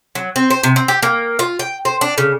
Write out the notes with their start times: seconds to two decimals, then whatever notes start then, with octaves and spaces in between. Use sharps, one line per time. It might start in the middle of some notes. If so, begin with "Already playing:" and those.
0.15 F#3
0.36 C4
0.50 C5
0.63 C3
0.76 C4
0.88 G4
1.03 A#3
1.39 F4
1.59 G5
1.85 C5
2.01 D4
2.18 C#3